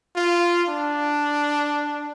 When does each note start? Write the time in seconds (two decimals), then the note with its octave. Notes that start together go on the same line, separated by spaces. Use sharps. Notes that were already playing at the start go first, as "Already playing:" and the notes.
0.16 F4
0.69 D4